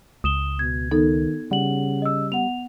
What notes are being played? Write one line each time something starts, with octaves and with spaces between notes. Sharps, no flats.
C#2 D#6 E7 G7
B2 G#6
D#3 B3 D#4 A4
C#3 G3 F#5 F#7
D#5 E6
B3 F#5 F7